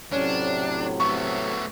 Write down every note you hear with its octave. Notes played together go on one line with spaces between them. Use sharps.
A2 C3 F#3 C#4 D4
A3 B3 C#6